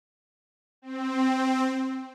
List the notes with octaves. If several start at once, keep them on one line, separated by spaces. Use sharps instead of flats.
C4